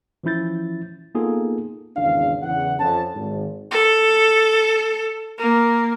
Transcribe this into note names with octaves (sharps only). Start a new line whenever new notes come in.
E3 F3 C#4 E4 G6 A6
A#3 B3 D#4 F4 G#4 A4
G#1 E2 C#3 D4 F5
E2 C#3 E3 F#5
F2 C#4 A5
G#1
A4
A#3